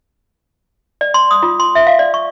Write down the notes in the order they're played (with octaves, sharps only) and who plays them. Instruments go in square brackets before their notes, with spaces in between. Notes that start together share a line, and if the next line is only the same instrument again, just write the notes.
[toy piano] D5
C6
D#6
F4
C6
E5
F5
D5
C#6